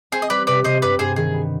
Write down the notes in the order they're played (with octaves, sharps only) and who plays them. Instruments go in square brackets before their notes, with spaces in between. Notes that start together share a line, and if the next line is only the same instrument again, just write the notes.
[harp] C4 [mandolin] G#4 C5
[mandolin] D#5
[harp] G3 [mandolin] B4 D5
[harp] C3 [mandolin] B4 D5
[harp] C3 [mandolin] C5 D#5
[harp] G2 [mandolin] B4 D5
[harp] G2 [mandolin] G#4 C5
[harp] D#3 [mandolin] G#4
[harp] B3